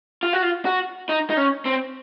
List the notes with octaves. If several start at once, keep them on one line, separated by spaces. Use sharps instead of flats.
F4
F#4
F4
F#4
D#4
D#4
C#4
C4